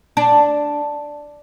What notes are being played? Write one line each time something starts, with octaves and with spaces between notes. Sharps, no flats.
D4